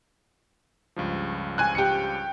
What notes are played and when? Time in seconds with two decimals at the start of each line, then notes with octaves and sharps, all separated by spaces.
0.96 C#2 G2 F3
1.58 G#5 F#6
1.75 G4 C#7